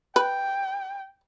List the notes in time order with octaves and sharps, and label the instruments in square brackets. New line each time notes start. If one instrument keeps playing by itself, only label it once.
[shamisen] B4 [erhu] G5